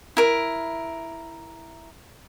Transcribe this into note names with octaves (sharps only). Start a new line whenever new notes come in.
E4 A#4